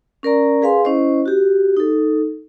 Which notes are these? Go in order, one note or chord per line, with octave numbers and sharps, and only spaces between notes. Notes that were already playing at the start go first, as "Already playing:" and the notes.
C#4 A#4 D5 A#5
G#4 B4 F5 G#5 C6
C#4 E4 C5 D#5
F#4 G4
D#4 A4